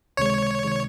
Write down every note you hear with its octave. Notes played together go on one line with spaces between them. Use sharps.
C#2 C3 D#3 G#3 C#5
C3 D#3 G#3